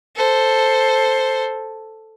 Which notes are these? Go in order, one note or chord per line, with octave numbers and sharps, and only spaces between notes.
A4 C5